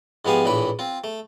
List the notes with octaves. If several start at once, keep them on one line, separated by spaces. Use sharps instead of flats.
G#2 F3 B3 G4 F5 G#5
A#1 A2 E3 B4 B5
C4 F4
A3